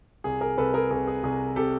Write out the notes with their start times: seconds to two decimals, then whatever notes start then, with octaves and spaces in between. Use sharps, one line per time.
0.24 C2 G#4
0.41 G#4 A#4
0.58 C2 A4 B4
0.74 G#4 A#4
0.90 C2 G#4 A#4
1.07 G#4
1.23 C2 G#4
1.56 C3 G4 A4